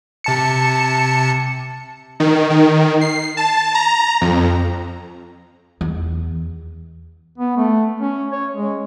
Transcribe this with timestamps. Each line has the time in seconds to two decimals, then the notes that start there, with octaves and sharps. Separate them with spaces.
0.24 C3 A5 C#7
2.20 D#3
2.50 D#3
3.01 C7
3.37 A5
3.75 A#5
4.21 F2
5.81 E2
7.38 B3
7.57 A3
8.01 C#4
8.32 C#5
8.55 G#3